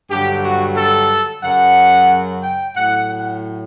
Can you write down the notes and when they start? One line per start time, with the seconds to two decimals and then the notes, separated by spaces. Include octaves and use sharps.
0.10 G2 D3 F#3 G4
0.44 F#4
0.77 A4
1.43 F#2 C#3 F#3 F#5
2.43 G5
2.76 A2 F#3 F#5
3.09 F#5